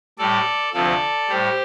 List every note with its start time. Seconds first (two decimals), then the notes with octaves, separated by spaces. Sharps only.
0.18 A2 G3 A4 D5
0.74 D2 C3 F3 A4 D5
1.29 A2 G3 G4 C5